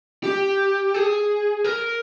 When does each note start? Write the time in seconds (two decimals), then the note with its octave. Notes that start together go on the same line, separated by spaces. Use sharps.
0.24 G4
0.94 G#4
1.64 A#4